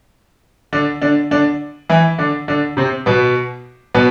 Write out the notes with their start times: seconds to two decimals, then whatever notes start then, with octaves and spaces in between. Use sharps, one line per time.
0.73 D3 D4
1.02 D3 D4
1.31 D3 D4
1.90 E3 E4
2.18 D3 D4
2.48 D3 D4
2.77 C3 C4
3.06 B2 B3
3.94 B2 B3